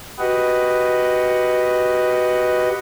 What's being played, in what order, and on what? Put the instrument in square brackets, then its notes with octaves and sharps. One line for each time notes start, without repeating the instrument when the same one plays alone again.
[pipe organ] F#4 G4 B4 D#5 F#5